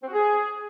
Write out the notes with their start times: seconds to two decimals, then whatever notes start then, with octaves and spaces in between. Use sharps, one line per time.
0.02 C4
0.08 F#4
0.13 G#4